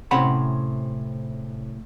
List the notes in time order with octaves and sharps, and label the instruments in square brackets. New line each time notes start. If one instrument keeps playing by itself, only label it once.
[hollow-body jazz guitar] A2 C3 C4 C#4 F#5 B5